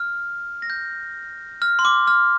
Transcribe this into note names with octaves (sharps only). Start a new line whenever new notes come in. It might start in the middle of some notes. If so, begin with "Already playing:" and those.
Already playing: F6
A#6
G6
F6
C6
D6
F6